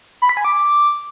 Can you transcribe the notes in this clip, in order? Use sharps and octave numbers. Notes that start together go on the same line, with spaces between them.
B5
B6
G#5
D6